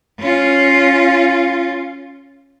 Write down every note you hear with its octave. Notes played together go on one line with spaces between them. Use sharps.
C#4 F4